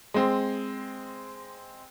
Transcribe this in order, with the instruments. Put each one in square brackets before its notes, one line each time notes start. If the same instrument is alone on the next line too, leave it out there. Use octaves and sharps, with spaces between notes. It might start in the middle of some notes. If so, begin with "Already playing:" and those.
[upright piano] G#3 C4